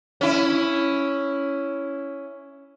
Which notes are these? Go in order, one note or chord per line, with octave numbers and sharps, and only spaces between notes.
C#4 E4